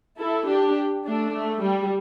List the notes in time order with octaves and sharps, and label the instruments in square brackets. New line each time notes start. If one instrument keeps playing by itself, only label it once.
[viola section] E4 A4
D4 G4
A3 D4
A3
G3